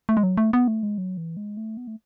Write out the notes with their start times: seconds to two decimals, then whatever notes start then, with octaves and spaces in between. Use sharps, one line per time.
0.09 A3
0.17 G#3
0.23 F#3
0.38 A3
0.53 B3
0.68 A3
0.83 G#3
0.98 F#3
1.17 E3
1.37 G#3
1.57 A3
1.77 B3
1.87 A3